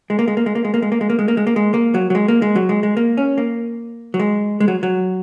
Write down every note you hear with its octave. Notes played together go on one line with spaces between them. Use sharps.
G#3
A#3
G#3
A#3
G#3
A#3
G#3
A#3
G#3
A#3
G#3
A#3
G#3
A#3
G#3
A#3
G#3
A#3
F#3
F#3
G#3
A#3
G#3
F#3
G#3
G#3
A#3
C#4
A#3
F#3
G#3
G#3
F#3
F#3